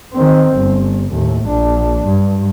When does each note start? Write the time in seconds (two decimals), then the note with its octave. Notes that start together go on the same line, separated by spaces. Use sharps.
0.13 D#3 C4
0.57 G1
1.10 D#2 A2
1.46 A#1 D4
2.05 G2